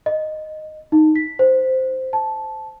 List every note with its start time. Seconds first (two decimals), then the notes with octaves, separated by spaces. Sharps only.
0.06 D#5
0.92 D#4
1.16 B6
1.39 C5
2.13 A5